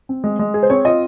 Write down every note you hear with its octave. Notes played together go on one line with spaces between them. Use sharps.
C4
G#3
G#3
G#4
C5
C4 C#5
F4 D#5